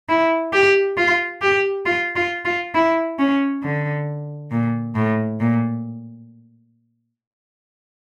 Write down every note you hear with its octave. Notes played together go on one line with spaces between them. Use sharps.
E4
G4
F4
G4
F4
F4
F4
E4
C#4
D3
A#2
A2
A#2